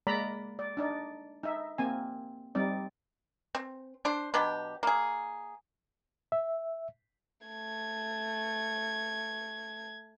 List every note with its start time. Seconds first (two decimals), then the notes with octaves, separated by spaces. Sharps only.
0.07 G#3 A#3 D5 A#5 B5
0.59 D5
0.77 D4 D#4 D5
1.43 D#4 E5
1.78 A#3 C4 G#5
2.55 G3 C4 D#4 D5
3.55 C4
4.05 D4 C5
4.34 B2 F#3 D4 G4
4.83 A#3 G#4
6.32 E5
7.47 A3 G#6